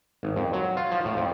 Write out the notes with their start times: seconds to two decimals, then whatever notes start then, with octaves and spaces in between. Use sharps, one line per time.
0.23 G#1
0.36 F2
0.53 F#3
0.77 F4
0.91 F3
1.05 A2
1.17 F2